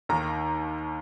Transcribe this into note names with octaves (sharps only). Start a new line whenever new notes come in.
D#2 D#3 A#5